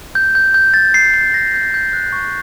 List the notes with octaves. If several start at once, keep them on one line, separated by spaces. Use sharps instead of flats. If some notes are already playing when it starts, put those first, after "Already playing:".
G6
G6
G6
A6
C7
C7
A#6
G6
G6
F#6
C#6